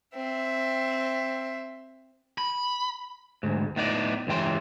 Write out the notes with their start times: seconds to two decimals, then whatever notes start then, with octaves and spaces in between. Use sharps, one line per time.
0.16 C4 E5
2.38 B5
3.43 D2 G#2
3.76 A2 B3 D#4 D5
4.27 C#2 G2 E3 G5 C6